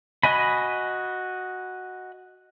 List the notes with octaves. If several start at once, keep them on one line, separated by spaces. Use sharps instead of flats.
F#4 D#5 G#5 B5